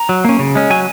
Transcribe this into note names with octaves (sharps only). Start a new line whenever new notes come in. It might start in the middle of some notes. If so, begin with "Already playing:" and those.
Already playing: A#5
F#3
A#3 C#4
C#3
G#3 C#4
F#3 G#5